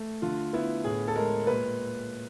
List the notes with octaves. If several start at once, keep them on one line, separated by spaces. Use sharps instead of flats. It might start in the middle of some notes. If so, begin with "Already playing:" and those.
Already playing: A3
D3 F4
B3 E4
A2 G#4
A4
G#3 A#4
A#2 B4